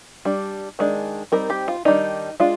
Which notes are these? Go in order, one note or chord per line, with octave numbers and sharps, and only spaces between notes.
G3 D4
D#3 G#3 D4
G3 C4 D#4 A#4
G4
F4
D#3 G3 D4 D#4
G#3 D4 F4